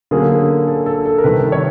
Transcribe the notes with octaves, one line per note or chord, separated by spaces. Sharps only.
D3 F#3 A#3 C#4 G#4
A4
A4
A4
A#4
C3 D#3 G3 B4
C#5